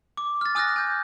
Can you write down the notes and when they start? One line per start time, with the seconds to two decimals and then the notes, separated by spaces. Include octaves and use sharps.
0.17 D6
0.41 F6 A6
0.55 G#5 D#6 F6 F#6 A6 A#6
0.76 G#5 G6